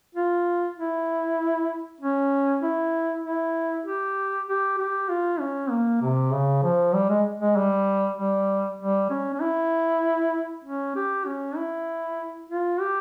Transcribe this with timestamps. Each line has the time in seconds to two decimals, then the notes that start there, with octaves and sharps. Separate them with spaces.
0.14 F4
0.76 E4
2.00 C#4
2.62 E4
3.23 E4
3.85 G4
4.46 G4
4.78 G4
5.09 F4
5.39 C#4
5.70 A#3
6.01 C3
6.32 C#3
6.63 F3
6.93 G3
7.09 G#3
7.40 G#3
7.56 G3
8.17 G3
8.78 G3
9.10 C#4
9.34 C#4
9.40 E4
10.64 C#4
10.95 G4
11.25 C#4
11.56 E4
12.49 F4
12.80 G4